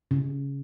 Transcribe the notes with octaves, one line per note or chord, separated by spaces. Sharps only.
C#3